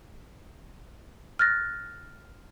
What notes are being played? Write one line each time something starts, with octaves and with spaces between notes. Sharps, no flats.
F6 F#6 A6 A#6